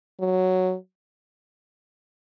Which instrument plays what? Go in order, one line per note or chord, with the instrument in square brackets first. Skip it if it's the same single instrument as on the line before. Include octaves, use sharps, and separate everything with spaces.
[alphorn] F#3